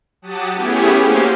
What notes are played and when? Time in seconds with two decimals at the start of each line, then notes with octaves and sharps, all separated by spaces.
0.22 F#3 G4 F#5 A5 D#6 A6
0.53 A3 B3 C#4 E4 G4 G#4
1.00 A#3 C#4 F#4 G4 C5 F5